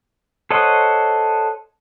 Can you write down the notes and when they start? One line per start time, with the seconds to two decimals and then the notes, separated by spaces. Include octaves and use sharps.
0.51 A4 C5 C#5 D#5 F#5